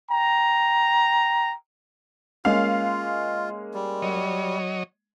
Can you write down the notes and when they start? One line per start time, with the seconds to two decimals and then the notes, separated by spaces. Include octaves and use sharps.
0.10 G5 A#5
2.45 G#3 A#3 C#4 F4 F5
3.74 G3
4.02 F#3 C#5 D#5